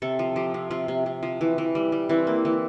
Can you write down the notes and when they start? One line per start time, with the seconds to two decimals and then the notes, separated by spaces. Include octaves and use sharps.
0.02 C3 A4
0.19 F3
0.36 F3 G4
0.54 C3
0.71 C3 F4
0.88 C3
1.06 C3
1.23 F3
1.41 E3
1.58 E3
1.75 G3
1.92 G3
2.09 E3 C4
2.27 A#3
2.45 E3